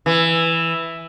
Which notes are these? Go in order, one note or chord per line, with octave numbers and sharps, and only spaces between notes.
E3